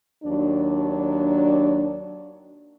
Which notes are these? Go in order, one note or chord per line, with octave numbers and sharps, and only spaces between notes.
D#2 F#3 D4